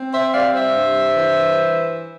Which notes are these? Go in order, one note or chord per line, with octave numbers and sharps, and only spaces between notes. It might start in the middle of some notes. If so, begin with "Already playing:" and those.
Already playing: C4
C5 E5
G3 D5 F5
C5 E5
G2
E3